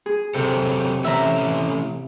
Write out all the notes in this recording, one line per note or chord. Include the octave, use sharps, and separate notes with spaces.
G#4
C3 F#3 C4 A4
E3 A3 C#4 E5 A#5